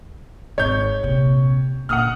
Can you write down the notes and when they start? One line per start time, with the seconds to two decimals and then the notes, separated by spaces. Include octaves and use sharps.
0.58 G#1 C#5 G6
1.03 A#1 C3
1.89 A#2 D3 F#5 D#6 F6